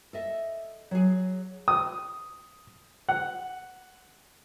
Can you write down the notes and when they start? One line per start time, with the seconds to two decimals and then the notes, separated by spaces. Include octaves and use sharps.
0.13 A4 D#5 E5
0.91 F#3 G#4
1.68 D#6
3.09 F#5